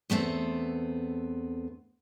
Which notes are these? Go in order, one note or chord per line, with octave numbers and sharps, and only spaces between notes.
E2 A3 B3 C4